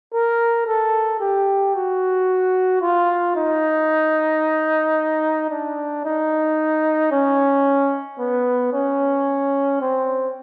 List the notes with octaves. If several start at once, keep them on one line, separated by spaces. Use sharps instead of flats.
A#4
A4
G4
F#4
F4
D#4
D4
D#4
C#4
B3
C#4
C4